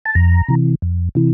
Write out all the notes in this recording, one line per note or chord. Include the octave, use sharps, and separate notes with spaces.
A5
F2 A#5
C3 E3
F2
C3 E3